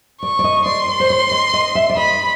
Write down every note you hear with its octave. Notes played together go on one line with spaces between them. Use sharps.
D5 C#6
D5
D#5
D5 C6
C#5
C5
C#5
D#5
D#5
E5
D5
D#5 B5